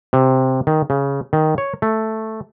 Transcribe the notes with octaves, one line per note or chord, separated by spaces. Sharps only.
C3
D#3
C#3
D#3
C#5
A3